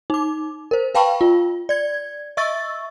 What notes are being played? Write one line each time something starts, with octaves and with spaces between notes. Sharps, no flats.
D#4 D6
A#4 C5
B4 F5 G5 A5 B5 C#6
F4
D5 G#6
D#5 E5 C#6 E6 A6